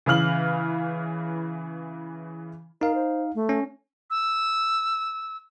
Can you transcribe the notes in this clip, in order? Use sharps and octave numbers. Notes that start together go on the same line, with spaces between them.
C#3 E3 F5 F6 F#7
D#4 A#4 F5
C5
A3
C#4
E6